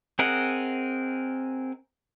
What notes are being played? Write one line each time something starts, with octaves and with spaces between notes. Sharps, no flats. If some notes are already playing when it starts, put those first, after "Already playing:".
C4 G#4 A#4 D#5 F#5